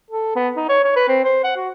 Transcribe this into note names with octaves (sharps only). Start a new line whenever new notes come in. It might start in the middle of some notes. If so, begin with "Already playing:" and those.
A4
B3
D#4
C#5
C#5
B4
C4
C5
F#5
F#4